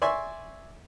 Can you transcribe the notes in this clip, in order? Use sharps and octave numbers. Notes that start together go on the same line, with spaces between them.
D5 E5 G#5 C6 C#6